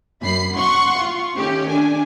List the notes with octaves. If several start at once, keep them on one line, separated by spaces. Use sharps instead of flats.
F#2 B5 C7
F#5 C6 C#6
F4
D#3 A3 C#4 G4
D4 G#5